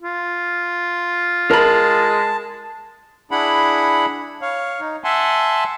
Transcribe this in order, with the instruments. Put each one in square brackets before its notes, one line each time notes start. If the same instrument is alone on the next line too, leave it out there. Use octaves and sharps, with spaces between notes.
[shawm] F4
[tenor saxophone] G#3 [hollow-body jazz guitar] A#4 B5 [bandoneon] A5
[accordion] D4 E4 G#4 F#5 B5
C#5 F5
D#4
E5 F#5 G#5 A5 C6